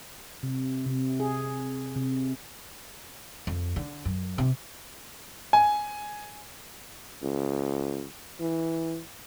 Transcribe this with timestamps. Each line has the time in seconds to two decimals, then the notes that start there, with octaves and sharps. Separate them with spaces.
0.43 C3
0.86 C3
1.20 G#4
1.96 C3
3.47 F2
3.76 D3
4.05 F#2
4.38 C3
5.53 G#5
7.22 C#2
8.40 E3